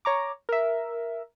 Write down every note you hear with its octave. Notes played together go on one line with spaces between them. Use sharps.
C#5 A#5 D6
A#4 E5